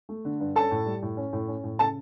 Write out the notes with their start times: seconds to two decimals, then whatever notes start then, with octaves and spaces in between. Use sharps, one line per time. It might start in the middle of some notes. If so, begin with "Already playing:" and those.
0.09 A3
0.25 D3
0.40 G2
0.55 C#4 A4 A5
0.71 A2
0.86 G3
1.02 A2
1.17 C#4
1.33 A2
1.48 C#4
1.63 A2
1.79 C#3 A4 A5